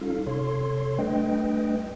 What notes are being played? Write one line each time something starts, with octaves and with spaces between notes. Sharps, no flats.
G3 C#4 D#4 F4 A4 F5
C3 A4 C#5 C6
G3 A3 D4 B4 D#5 G5